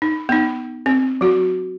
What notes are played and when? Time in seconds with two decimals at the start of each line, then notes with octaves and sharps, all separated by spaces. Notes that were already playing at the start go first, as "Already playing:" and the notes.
0.02 D#4
0.29 B3 D#4
0.86 C4
1.21 F#3 F#4